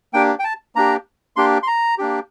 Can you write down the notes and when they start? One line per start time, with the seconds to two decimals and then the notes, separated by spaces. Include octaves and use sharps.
0.13 A#3 D4 G4 G5
0.39 G5
0.44 A5
0.75 A#3 D4 G4 A#5
1.36 A#3 D4 G4 C6
1.63 C6
1.67 A#5
1.98 A#3 D4 G4